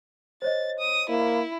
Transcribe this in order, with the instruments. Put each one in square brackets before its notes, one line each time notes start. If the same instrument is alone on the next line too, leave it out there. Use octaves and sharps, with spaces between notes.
[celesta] C5 C#5 D#5 [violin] A6
[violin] D#6
[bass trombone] A#3 [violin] E4